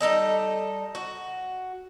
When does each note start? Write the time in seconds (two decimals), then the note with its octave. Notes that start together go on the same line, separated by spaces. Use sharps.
0.01 G3 D#4 A4 D#5
0.95 F#4